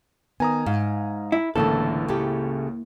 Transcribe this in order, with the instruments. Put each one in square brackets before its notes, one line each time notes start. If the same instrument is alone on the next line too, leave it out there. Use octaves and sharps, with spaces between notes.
[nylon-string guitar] D#3 [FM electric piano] B3 [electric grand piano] G#5 A#5 D#6
[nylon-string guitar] G#2 [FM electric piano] F5
[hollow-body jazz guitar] E4
[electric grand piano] C#2 A2 [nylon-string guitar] D3 E3 A3 [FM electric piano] A#3 E4 [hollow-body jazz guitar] A4
[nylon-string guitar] C#3 A3 G4